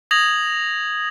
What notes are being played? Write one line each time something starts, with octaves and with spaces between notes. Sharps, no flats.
D#6 G#6 A#6 F7 F#7